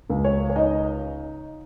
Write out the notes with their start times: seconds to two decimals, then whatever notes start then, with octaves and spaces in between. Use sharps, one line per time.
0.10 C#2
0.24 C#5
0.50 C#5
0.56 D#4 D#5